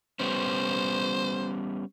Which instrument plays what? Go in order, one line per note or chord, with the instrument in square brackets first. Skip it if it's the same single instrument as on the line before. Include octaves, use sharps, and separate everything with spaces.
[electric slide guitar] G3 B3 C#4 [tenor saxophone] C5